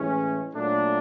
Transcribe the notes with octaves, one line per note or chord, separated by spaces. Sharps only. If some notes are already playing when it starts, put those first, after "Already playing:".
Already playing: A2 E3 G#3 C#4
A#2 F#3 A3 D4